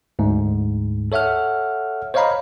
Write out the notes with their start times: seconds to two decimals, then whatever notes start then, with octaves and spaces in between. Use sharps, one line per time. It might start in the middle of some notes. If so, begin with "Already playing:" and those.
0.19 D2 G#2
1.12 A4 C#5 E5 F#5 F6
2.14 C5 C#5 D#5 F5 A#5 B5